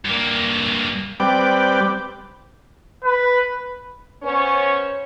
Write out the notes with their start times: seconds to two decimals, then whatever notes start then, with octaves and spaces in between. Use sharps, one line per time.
0.05 G2 A#3
1.20 G3 C4 B4 D5 G5 D6
3.04 B4
4.22 B3 C#4 C5 C#5